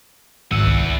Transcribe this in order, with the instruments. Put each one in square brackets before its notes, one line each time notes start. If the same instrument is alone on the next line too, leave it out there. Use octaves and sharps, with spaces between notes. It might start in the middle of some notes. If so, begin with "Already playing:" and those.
[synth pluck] G#1 E6 D#7 [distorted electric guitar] E2 F#5
[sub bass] C2